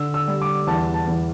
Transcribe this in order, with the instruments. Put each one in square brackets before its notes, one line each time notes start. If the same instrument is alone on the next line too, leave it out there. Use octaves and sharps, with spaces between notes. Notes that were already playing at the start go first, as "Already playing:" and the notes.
Already playing: [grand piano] D3 E6
E6
G3
D6
E2 A5
A5
E2